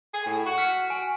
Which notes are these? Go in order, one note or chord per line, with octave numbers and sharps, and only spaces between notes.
G#4
A2
F#4
F6 B6 C#7
G#5